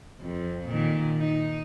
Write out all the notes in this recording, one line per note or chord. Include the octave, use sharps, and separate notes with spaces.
F2
A#2 D#3
D#4